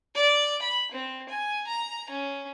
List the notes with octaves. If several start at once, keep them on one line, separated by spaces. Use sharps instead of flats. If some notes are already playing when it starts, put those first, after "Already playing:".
D5
B5
C4
G#5
A#5
C#4